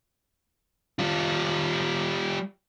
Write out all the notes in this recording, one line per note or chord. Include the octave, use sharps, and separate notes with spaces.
G3 F4